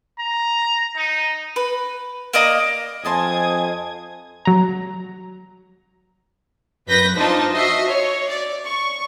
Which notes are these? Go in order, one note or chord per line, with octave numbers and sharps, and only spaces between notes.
A#5
D#4
B4
A#3 D5 D#5 A#5
F2 C5 D#5 G#5 A5 C6 D#6 G#6
F#3 A#5
F#2 B4 G6 A#6 B6
D4 D#4 F4 C5 D#5 A5
F#4 D#5 E5 C7
C#5
D5
C#6